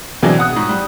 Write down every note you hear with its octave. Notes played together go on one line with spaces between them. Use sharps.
B2 E3 F#3 C4 D4 G#4
F#5 D#6 F#6
G#2
G3